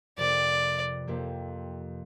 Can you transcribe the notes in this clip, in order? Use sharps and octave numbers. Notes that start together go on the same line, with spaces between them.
F2 C3 A#3 G4 D5
F2 C3 A#3 G4